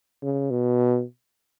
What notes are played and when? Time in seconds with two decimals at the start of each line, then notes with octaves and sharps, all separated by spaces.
0.23 C#3
0.51 B2